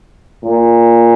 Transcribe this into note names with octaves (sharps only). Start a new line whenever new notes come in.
A#2